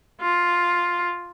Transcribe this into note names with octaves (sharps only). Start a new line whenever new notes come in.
F4